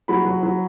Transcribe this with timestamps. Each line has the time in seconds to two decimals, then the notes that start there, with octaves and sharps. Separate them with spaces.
0.08 F#3 B5
0.25 F#3
0.43 F#3